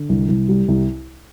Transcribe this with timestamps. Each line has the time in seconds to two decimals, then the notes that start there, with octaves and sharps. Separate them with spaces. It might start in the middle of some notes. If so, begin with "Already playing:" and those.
Already playing: D3
0.09 C2
0.29 C2
0.48 G3
0.68 C2